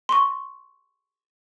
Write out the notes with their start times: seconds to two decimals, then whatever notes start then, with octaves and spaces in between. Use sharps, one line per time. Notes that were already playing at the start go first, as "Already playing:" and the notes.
0.09 C6 C#6